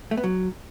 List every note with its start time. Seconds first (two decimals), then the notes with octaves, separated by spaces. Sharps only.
0.11 A3
0.17 B3
0.24 F#3